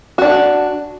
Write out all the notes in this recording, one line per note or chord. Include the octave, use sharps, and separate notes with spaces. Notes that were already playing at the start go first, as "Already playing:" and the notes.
D4 F#4